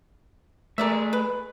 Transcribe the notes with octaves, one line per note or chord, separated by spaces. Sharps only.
A3 G#4 A#4 D5 E5
B4